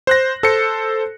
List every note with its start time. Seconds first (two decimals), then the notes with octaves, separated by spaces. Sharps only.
0.07 C5 F#6 A#6
0.43 A4 C5 C#7